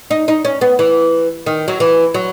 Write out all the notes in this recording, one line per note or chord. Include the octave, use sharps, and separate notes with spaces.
D#4
D#4
C#4
B3
E3
D#3
F#3
E3
F#3